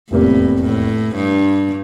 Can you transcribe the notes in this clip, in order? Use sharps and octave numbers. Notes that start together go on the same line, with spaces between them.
F1 E2 A2 C3 G3 A#3
A2
G2